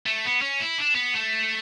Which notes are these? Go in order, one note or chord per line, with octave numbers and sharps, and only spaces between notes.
A3
B3
C#4
E4
D4
B3
A3